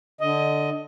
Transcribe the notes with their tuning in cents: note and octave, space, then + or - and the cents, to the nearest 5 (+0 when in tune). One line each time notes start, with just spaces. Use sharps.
D3 +5 D#5 +10